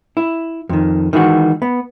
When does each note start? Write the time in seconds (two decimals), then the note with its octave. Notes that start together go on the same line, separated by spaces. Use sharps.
0.17 E4
0.69 F2 D#3
1.13 D#3 E3 G#3 F#4
1.62 B3